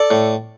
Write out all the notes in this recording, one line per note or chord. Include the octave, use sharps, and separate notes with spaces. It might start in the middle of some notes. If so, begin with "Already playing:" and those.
Already playing: A4 D5
A2